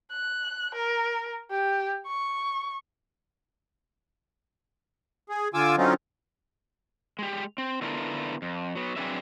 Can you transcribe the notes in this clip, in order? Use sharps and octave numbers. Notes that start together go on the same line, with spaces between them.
F#6
A#4
G4
C#6
G#4
D3 F4 G#5 D6 E6
D3 F#3 C4 C#4 D#4 F4
G#3 G4
C4
D3 B3 E4 F4 A4 A#4
F2
F#3 B3
F#3 C4 D4 G#4 B4 E5